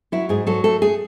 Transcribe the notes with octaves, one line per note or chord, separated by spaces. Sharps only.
F#3 E4
G#2 G#4
F#3 A4
A3 A4
A3 G#4